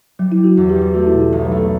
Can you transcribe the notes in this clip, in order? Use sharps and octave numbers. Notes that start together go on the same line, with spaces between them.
F#3 G3
E4
G3
F#4
E2
G4
G3
G4
A3 F#4
E4
B2
G4
B1 G4
A4
A3
A4